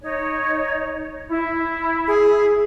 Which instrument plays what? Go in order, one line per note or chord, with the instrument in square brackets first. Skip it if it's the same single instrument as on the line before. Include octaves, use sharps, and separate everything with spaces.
[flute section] D#4 C#5
E4
[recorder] G#4